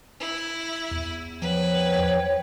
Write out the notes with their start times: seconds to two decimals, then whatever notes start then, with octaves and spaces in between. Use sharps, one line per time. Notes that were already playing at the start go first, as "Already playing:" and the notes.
0.20 E4
0.92 E2
1.42 F3 B4 C#5 F#5 G5